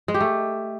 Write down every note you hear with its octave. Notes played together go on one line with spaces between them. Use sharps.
G#3
G4
A3